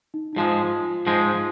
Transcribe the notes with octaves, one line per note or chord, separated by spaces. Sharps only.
D#4
D#4
G#2 F3 G#3 F4
G#2 F3 G#3